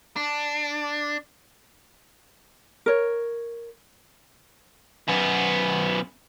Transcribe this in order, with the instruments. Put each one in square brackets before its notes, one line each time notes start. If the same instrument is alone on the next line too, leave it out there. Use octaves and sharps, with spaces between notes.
[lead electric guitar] D4
[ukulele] A#4 C#5
[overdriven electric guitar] F#2 B3